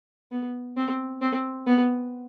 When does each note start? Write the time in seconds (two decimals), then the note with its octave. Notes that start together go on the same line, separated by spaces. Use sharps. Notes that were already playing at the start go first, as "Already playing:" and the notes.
0.32 B3
0.76 C4
1.21 C4
1.67 B3